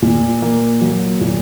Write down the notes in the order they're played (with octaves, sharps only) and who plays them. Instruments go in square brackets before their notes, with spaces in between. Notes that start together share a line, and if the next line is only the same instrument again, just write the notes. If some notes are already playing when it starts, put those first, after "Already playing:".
[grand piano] A#2
A#3
F#3
A#2